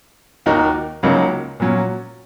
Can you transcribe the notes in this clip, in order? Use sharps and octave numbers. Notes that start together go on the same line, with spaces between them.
D#2 D#3 A#3 D#4 F#4
C#2 C#3 F#3 A#3 D#4
A#2 F#3 C#4